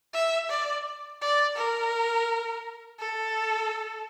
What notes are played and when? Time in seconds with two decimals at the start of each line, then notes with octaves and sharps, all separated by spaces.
0.14 E5
0.50 D5
1.22 D5
1.56 A#4
3.00 A4